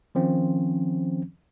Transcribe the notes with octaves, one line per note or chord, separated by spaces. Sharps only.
D#3 F3 C4 C#4